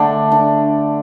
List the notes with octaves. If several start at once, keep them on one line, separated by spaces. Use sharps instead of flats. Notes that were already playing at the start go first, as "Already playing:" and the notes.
Already playing: D3 A3 D4
D4